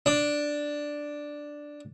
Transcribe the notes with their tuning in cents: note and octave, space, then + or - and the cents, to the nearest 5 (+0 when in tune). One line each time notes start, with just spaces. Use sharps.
D4 +0